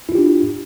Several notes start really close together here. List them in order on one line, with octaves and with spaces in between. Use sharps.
E4 F4 G4 D4